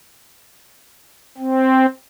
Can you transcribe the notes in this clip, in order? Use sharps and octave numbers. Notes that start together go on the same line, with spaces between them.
C4